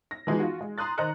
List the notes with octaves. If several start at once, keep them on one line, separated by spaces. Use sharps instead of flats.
A#6
E3 F3 G#3 B3 D#4 F#4
F4 F#4
G#3
A#5 C6 D#6 F#6 A6
D#3 C5 D#5 A#5 F#6 C#7